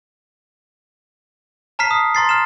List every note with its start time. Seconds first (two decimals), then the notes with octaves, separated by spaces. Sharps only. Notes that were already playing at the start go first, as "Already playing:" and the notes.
1.79 A5 A#5 F6 B6 C7
1.91 D#6
2.15 A#5 C6 A6 C7
2.29 F6 E7